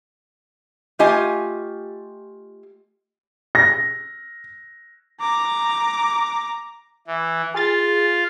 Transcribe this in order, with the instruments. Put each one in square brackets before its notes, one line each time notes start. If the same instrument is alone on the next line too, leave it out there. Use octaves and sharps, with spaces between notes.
[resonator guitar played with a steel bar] A3 F4 G4 D#5 G#5
[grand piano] A#6
[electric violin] A#5 D6
[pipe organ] E3
[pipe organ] F4 [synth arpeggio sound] G#4 A6